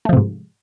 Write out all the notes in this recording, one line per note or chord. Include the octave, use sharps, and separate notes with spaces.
G#2 C3 F3 A3